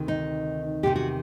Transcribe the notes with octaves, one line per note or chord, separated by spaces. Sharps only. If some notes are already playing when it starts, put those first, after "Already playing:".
Already playing: D2 C3 D#3
D#4
E2 C3 D#3 G4
F#4